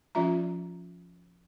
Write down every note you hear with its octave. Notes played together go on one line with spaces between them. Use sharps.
F3 C#4 F4 E5 A#5